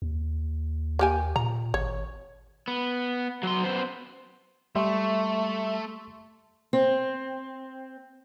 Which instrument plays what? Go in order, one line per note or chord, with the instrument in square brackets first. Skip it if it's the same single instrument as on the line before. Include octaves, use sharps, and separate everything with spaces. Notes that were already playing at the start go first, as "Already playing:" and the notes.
[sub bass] D#2
[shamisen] A#3 G4 G#5
[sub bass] A#2 [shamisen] A#5
[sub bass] G#1 [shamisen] C#5
[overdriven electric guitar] B3
F#3 C6
B3 C5
[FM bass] G3 [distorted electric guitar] A3 [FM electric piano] E5 [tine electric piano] C6 C#6
[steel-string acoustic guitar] C4